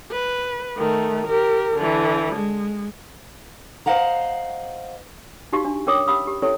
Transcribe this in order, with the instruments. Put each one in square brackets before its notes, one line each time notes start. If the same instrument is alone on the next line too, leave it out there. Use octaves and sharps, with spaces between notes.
[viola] B4
D#3 A3
G4 A#4
D3 E3
G#3
[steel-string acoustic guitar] C5 D#5 F5 F#5 A#5
[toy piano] D#4 F#4 G4 F5 C#6
D4
C#4 A#4 C#5 G5 D6 D#6
C#4 G4 F5 B5 D#6 E6
G4
C#4 E4 G4 A4 C#5 E5